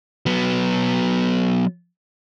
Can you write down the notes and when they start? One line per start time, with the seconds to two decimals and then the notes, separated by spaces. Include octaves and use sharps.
0.26 F#3 B3